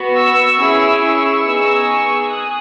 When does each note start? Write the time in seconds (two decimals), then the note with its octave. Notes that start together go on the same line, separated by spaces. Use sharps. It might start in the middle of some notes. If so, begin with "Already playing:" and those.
Already playing: B3 F#4
0.16 C#6 E6
0.59 C#4 E4 G#4
1.02 C#6 E6
1.44 B3 D#4 G#4
2.30 G#4 D#6 F#6